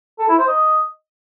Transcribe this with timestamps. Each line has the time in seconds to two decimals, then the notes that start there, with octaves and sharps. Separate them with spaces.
0.19 A4
0.29 E4
0.38 C5
0.48 D#5